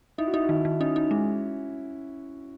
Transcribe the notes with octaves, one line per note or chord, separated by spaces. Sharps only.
D#4 E4
F#4
D#4 E4
F#4
D#3 E4
D#3
C#4 D#4
D#4
G#3